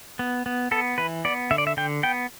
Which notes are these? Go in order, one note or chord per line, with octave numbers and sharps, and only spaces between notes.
B3
B3
B3 A4
E3 B4
B3 D5
D3 E5
D5
E5
D3 G5
B3 G5